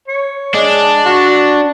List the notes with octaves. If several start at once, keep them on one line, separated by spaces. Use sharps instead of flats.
C#5
G#3 D4
F#4